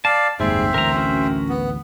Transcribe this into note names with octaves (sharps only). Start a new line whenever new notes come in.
D5 F5 A5
F#1 D#2 G#2 G3 C4 G#4 C5 E5
A1 D2 A2 A#4 A#5
C#4 F#4 A#4
B3